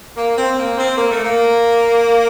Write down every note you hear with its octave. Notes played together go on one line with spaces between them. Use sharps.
A#3
C4
A#3
C4
A#3
A3
A#3